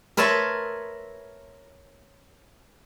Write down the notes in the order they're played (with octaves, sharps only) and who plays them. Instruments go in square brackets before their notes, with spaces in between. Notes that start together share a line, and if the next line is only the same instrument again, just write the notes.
[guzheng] A#4 B4 C#5 E5 A5 C6